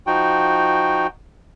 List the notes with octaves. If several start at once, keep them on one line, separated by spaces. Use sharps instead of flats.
F3 D#4 F#4 G5